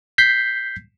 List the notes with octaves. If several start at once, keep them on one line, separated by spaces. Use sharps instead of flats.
G6 B6 C7